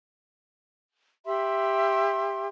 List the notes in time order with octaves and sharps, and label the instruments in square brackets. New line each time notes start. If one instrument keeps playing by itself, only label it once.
[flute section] G4 E5 B5 C6